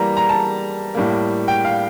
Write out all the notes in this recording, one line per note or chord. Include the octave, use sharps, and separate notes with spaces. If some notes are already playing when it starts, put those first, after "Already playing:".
Already playing: E3 G3 A#3 A#5
A#5
A5
A2 G3 A#3
G5
F5